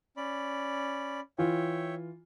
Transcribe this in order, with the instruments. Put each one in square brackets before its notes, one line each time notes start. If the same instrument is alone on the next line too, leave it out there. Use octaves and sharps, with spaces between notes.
[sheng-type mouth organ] C#4 D5 B5
[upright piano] E3 F4 [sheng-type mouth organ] C#5 E5 G5